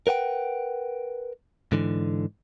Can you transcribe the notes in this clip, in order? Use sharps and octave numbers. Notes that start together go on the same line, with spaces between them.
A#4 B4 F#5 G5
G#2 D3 E3